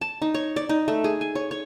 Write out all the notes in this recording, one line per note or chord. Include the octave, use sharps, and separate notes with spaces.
A5
D#4
C#5
D5
D#4
A3
G#4
G#5
C#5
C#5